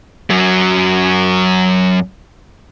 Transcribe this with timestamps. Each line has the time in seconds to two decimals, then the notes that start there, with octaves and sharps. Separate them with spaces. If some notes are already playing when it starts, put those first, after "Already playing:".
0.30 F#2 F#3